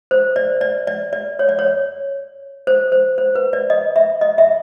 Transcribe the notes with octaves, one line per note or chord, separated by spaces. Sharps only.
C5
D5
D5
D5
D5
C#5
D5
C#5
C5
C5
C5
B4
D5
D#5
E5
D#5
E5